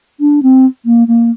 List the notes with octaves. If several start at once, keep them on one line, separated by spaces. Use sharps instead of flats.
D4
C4
A#3
A#3